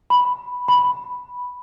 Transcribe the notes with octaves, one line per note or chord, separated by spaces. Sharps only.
B5
B5